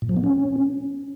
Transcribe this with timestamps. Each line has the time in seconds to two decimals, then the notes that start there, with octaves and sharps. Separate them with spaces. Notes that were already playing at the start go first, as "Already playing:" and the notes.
0.02 A#2
0.09 F3
0.16 B3
0.24 C#4